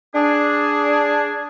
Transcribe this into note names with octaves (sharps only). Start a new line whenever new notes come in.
D4 G#4